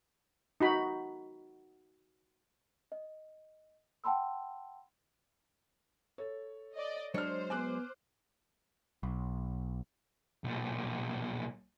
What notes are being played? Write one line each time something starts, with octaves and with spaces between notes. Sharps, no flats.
D#4 F#4 B5
D#5
F#5 G5 A5 B5 C6 E6
A4 C#5
D5 D#5
F#3 G#3 D4 C5 C#5 F6
B3 G#5 D6 F#6
B1
B1 A#2